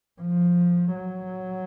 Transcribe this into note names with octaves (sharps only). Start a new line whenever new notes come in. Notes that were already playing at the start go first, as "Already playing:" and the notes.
F3
F#3